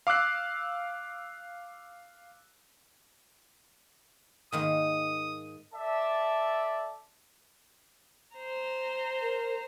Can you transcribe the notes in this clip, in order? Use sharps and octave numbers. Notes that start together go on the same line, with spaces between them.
F5 D6 E6 F#6 C7
G#2 D#3 A#3 D#6
A4 D5 E5 A5
C5 A#5
A#4